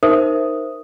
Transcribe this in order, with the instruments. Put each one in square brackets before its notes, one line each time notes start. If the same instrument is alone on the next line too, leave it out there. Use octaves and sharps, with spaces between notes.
[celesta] D#4 A#4 C5 E5 D#6